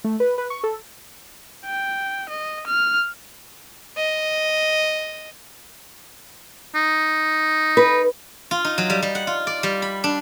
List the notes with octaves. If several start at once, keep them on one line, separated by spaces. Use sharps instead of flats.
A3
B4
B4
C#6
A4
G5
D#5
F6
D#5
D#4
B4
F4
D#4
F#3
G3
G3
F#5
F4
D5
G3
B5
D4